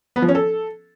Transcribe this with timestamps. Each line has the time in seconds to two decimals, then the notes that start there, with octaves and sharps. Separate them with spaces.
0.16 B3
0.22 F3
0.28 C#4
0.35 A4